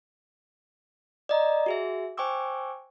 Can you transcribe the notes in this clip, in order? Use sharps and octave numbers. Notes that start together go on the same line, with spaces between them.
D5 D#5 A#5
F#4 G#4 E5
C5 G5 G#5 C#6 D6 E6